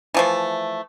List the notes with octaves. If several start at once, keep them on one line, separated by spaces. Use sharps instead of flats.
E3 F3 A3